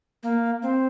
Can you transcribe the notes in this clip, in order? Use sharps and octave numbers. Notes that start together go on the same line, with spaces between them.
A#3
C4